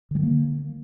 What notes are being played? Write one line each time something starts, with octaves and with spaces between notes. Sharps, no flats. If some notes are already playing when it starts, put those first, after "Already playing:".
D3 D#3 G3 A#3